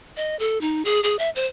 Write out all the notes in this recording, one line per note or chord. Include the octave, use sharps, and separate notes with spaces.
D#5
A4
D#4
G#4
G#4
E5
C5